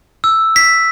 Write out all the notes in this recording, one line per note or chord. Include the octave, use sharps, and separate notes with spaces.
E6
B6